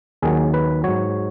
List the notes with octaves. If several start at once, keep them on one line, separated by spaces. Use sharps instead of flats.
D#2 D#3 F#3 G#4
B4
G#2 F#3 C#5